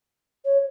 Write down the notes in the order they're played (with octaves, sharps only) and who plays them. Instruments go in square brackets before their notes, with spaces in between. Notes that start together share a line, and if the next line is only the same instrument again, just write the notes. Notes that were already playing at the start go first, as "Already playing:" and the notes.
[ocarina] C#5